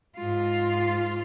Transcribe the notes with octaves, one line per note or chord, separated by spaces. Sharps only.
G#2 F4